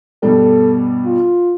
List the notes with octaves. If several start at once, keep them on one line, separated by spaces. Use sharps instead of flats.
G2 B2 G3 A4
F4